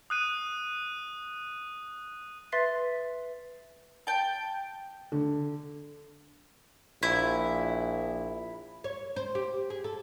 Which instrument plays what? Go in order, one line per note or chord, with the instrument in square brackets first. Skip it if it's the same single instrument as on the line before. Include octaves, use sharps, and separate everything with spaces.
[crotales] D#6 F#6 D#7
[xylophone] B4 E5 C6 A6 B6 C7
[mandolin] G5 A5
[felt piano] D3
[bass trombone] A#1 [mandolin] E4
[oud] C#5
C5
G4
G#4
A4